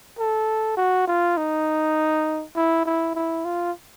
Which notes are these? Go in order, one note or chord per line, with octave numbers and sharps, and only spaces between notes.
A4
F#4
F4
D#4
E4
E4
E4
F4